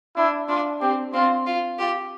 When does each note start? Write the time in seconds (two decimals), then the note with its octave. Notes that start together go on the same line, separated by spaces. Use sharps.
0.16 D4 E4
0.48 D4 F4
0.81 C4 G4
1.13 C4 F4
1.46 F4
1.78 F4 G4